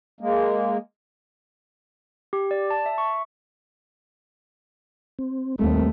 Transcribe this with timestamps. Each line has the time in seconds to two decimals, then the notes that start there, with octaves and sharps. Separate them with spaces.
0.20 G#3 A#3
2.33 G4
2.51 D5
2.71 A5
2.86 E5
2.98 C#6
5.19 C4
5.59 D#2 G3 A3 A#3 C4